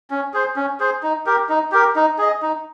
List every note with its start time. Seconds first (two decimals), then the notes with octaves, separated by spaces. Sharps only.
0.11 C#4
0.34 G#4 C5
0.56 C#4
0.80 G#4 C5
1.03 D#4
1.26 G4 A#4
1.49 D#4
1.72 G4 A#4
1.96 D#4
2.18 G#4 D#5
2.42 D#4